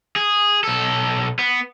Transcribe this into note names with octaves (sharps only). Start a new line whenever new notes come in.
G#4
B1 A4
B3